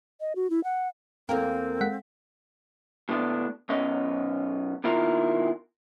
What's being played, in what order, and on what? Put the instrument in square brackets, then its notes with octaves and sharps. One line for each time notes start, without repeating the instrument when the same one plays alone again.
[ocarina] D#5
F#4
E4
F#5
[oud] E2 A#3 A#4 [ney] C4 [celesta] A4 F5 G5
[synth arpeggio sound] G#3 F#5 B6
[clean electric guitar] A2 D3 B3 D4
B1 F#2 B3 C#4 D#5
B2 D#3 E4 F4 A#4 A#5